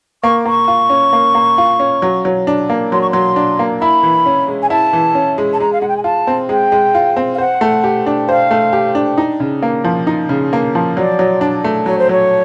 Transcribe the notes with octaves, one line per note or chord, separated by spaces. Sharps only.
A#3 C#6
A#3 C#6
F4
C#4
A#3
A#3
F4
C#4
F#3
F#3
D4
A#3
F#3 C6
C#6
F#3 C6
D4
A#3
E4 B5
E3
C#4
G#3
G#5
E4 A5
E3
C#4
G#3
A5
G#3 A#5
F5
G#3 F#5
G5
G#5
F4 A5
C4
G#3 G5
G#3
F4
C4
F5
C5 F#5
A3
G4
D4
C5 F5
A3
G4
D4
D#4
C#3
A#3
F3
D#4
C#3
A#3
F3
F#3 D5
F#3
D4
A3
F#3 C#5
C5
F#3 C#5